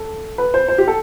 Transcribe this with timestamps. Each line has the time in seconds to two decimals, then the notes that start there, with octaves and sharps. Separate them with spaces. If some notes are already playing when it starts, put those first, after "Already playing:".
Already playing: A4
0.38 B4
0.54 C5
0.68 C5
0.78 G4
0.88 A4